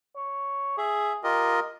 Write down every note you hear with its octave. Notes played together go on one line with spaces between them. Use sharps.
C#5
G#4 E5
F4 G4 A#4 D#5